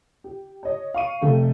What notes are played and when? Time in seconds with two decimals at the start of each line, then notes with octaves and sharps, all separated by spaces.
0.24 G4
0.63 C#5 D#5
0.94 F5 C#6 D#7
1.21 F1 A3 G4